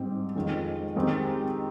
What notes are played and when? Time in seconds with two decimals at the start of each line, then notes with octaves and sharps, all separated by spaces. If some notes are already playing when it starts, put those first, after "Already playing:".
Already playing: G#2 G3 C4 G4
0.35 F2 D#3 G#3
0.96 D#3 G#3 C4 D#4 G4